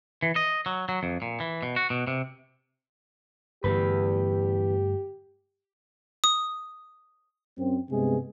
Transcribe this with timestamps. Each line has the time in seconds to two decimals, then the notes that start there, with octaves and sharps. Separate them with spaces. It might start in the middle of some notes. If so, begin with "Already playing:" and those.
0.23 E3
0.36 D#5
0.66 F#3
0.89 F#3
1.03 F2
1.22 A#2
1.40 E3
1.63 B2
1.76 F#4
1.90 B2
2.07 C3
3.64 E2 G2 D3 A3 G4 B4
6.24 D#6
7.58 F#2 C4
7.91 G2 C3 G#3 B3 G#4